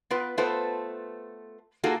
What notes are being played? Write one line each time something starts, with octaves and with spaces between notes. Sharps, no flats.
B3 F4 B4
A3 B3 F4 A4 B4 C5
A#3 D#4 F4 F#4 G#4 A4